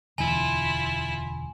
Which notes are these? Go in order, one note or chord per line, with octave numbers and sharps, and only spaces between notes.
E1 D2 E3 E4 F4 G#5